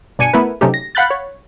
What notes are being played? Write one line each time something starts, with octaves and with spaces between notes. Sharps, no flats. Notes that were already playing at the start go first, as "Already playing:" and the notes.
G1 B2 D4 G#5 C#7 D#7
A3 B3 E4 A#4 B4
C3 F#3 A3 C#4 D#4 G4
A#6
F5 F#5 B5 F#6 G6 A6
C#5